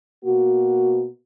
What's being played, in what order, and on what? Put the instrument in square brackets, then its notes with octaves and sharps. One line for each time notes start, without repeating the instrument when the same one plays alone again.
[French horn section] B2 A#3 F#4